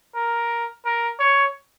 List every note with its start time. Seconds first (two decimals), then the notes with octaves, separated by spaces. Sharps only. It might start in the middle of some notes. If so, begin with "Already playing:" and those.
0.16 A#4
0.85 A#4
1.20 C#5